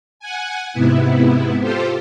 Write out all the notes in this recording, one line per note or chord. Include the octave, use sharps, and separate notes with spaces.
F#5 G#5
G#2 C3 B3 E4
F4 G4 A4 C5